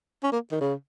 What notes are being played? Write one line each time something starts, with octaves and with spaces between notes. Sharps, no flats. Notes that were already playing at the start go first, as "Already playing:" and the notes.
C#4
A#3
D#3
C#3